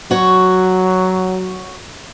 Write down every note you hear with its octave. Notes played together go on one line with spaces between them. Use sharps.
F#3 F#4 C#5